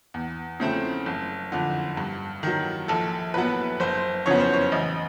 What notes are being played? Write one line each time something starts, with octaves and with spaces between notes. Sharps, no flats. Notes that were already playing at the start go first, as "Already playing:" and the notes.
E2
C#3 F3 A3 C4
F#1
F2 D3
G2
D#3 F#3
A#1 A4
A#2 F#3 B3 B4
F#1 C5
F2 C#3 F#3 B3 C#5
C5
C#5
A1 D#5